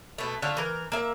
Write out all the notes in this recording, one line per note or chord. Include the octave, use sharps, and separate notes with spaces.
B2 A3
D3 A3 F4
E3 A#4
A#3 E5